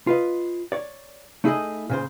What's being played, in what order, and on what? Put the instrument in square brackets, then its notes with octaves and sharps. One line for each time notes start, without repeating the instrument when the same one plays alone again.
[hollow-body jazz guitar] F4 B4 D#5
C#5 D5
A3 D#4 E4 G#4 D5 D#5
A#2 C#3 C5